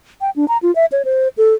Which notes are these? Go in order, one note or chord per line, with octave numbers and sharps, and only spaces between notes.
G5
D4
A#5
F4
E5
C#5
C5
A4